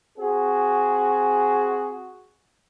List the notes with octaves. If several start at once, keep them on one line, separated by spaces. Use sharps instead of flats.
C4 F#4 G#4